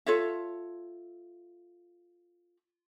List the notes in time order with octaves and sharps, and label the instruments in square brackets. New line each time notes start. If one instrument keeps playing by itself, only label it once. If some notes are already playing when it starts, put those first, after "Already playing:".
[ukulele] F4 A4 C#5 E5